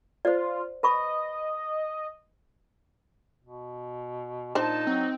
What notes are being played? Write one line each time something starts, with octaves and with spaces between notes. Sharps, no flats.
F4 C5 D5
B4 D#5 B5 C#6
B2
A#2 D4 D#4 C5 A5
F#3 C4